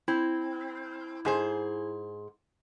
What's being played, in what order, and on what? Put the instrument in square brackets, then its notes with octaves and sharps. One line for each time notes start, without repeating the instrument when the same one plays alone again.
[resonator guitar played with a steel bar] C4 [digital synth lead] E4
[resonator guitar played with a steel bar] G#2 G#4 C5